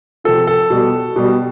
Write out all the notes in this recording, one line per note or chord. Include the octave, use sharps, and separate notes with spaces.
C3 F3 A4
A4
B2 G3
B2 G3